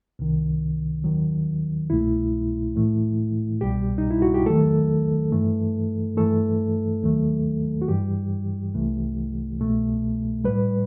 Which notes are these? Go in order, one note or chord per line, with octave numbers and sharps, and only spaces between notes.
C2 C3 D#3
D#2 D#3 F#3
C2 B2 A3 E4
A2 E3 A3
C2 B2 G3 G4
D#4
E4
F#4
G4
E2 D#3 F#3 A3 A4
G2 E3 A3
G2 E3 A3 A4
D#2 D#3 F#3 A3
F#4
G2 E3 G3 G4
C2 C3 E3 A3
C2 B2 A3
A2 G3 B4